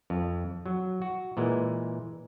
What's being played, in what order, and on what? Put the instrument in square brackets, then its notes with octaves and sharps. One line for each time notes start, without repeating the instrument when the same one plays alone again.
[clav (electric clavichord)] F2
F#3
F#4
A#2 E3 G#3